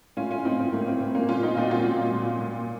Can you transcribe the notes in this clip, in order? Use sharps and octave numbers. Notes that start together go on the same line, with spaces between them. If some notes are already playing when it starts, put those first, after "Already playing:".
A2 C#4 F4
C#4 F4
A2 C4 D#4
C4
A2 A#3
C4
A2 C4
A#3 C#4
A#2 C#4 F4
C4 D#4
A#2 C4 D#4
F#4
C#4 F4
A#2
A#2
A#2